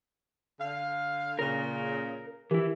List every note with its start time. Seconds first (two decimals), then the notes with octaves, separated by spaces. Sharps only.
0.60 D3 F5
1.39 A#2 C#3 A#4
2.51 E3 E4 G4 A#4